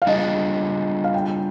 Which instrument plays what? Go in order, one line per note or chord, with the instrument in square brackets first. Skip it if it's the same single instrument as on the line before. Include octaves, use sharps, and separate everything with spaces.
[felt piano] F5
[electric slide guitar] G3 D4 F4 G#4 [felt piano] D#5
[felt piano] F5
G5